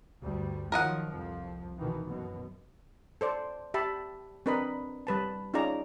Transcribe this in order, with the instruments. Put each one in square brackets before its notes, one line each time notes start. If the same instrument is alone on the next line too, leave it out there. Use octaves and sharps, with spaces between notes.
[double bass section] D2 G2 G3
[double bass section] D#3 F3 F#3 [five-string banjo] A#4 D#5 F#5
[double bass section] C2 F2 F3
B2 D#3 E3
F#2 B2
[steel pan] A4 C5 D5
G4 E5 A5 B5
C4 D4 A#4 B4 D#5 B5
G3 B4 A5
C#4 D#4 F4 G#4 D5 A#5